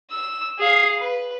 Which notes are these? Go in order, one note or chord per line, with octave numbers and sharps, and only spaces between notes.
E6
G#4 F5
B4